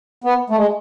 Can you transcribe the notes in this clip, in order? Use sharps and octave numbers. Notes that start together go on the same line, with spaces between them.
B3
A3
G#3